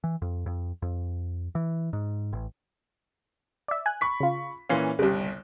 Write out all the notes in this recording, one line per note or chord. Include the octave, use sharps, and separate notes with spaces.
E3
F2
F2
F2
E3
G#2
A1
D5 E5
G#5 F#6
B5 C#6 B6
C#3 F4
A#2 E3 C#4 F5 C6
G1 C2 C#3 G3